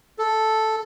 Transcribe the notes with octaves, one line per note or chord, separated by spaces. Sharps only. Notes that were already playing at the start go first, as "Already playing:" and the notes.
A4